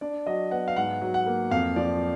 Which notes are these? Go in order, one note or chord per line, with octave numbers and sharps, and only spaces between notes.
D4 D5
F#3 D#5
B3 F#5
F5
G#2 F#5
F#3
F#5
A#3
F2 F5
F3 D5